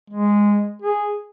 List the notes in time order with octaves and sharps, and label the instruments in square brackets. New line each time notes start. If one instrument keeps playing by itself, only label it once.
[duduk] G#3
G#4